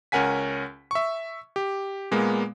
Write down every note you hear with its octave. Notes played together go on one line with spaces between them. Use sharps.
C#2 C#4 A#4 F#5 G#5 B6
E5 C#6
G4
A#2 G#3 A#3 B3